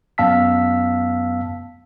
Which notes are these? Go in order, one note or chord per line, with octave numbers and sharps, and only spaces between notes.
F#2 B3 F5 A5 E6 B6